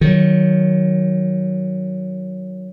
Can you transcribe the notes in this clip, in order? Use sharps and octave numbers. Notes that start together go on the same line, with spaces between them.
D#3 F#3